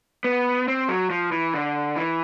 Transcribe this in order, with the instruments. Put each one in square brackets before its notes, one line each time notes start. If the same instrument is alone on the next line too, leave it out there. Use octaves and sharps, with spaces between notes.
[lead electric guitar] B3
C4
F#3
F3
E3
D3
E3